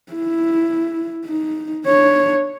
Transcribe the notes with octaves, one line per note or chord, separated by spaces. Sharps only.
E4
D#4
D4 C#5